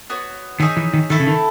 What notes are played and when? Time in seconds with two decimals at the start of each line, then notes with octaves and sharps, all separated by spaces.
0.10 B3 F#4 C#5
0.60 D#3 D#4 G#4 C#5 E5
0.77 E3
0.93 D#3
1.10 D#3 A3 E4 A4
1.20 C#3
1.27 D#3